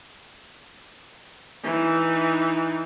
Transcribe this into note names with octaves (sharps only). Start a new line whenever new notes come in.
E3 D#4